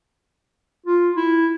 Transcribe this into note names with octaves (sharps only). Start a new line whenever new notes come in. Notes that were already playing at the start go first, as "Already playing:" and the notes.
F4
E4